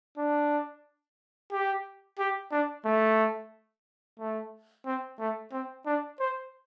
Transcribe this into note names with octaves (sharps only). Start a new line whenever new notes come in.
D4
G4
G4
D4
A3
A3
C4
A3
C4
D4
C5